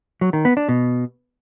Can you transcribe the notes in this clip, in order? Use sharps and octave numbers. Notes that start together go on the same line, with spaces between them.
F#3
D#3
B3
D4
B2